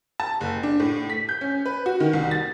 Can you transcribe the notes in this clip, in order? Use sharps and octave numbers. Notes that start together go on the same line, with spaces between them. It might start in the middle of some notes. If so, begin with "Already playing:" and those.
A5
F#1
D4
A2
B6
G6
C#4
B4
F#4
D#3
C2
A6